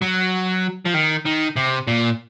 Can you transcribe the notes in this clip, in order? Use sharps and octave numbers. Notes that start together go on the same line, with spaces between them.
F#3
F3
D#3
D#3
C3
A#2